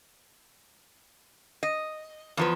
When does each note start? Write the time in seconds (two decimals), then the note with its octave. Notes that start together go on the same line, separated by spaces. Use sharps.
1.63 D#5
2.37 E2 F3 B4